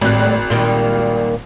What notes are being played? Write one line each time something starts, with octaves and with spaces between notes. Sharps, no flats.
G#1 A2 G3 F#6
A#2 D#3 G3